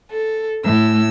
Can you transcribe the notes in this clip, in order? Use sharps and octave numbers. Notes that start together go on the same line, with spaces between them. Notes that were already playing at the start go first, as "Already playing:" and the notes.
A4
A2 E6